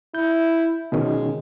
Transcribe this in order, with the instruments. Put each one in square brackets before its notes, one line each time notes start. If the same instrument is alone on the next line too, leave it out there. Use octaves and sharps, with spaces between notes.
[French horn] E4 [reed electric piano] G6
[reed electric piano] B2 D#3 C#4 [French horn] G#3